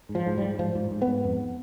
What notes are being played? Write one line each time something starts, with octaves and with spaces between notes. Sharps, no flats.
G#2
F3
G#2
G#2 G3
G#2 F3
G#2
G#2
B3
G#2
F2